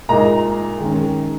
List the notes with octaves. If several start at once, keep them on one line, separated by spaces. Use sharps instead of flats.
A#2 G#3 D#4 A#5
D#3 G#3 C#4